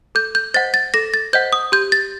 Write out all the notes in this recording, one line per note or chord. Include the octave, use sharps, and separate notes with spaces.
A4 G6
G6
C5 D#5 F#5 A6
A6
A4 A#6
A6
C5 D#5 F#5 G6
D#6
G4 G6
A6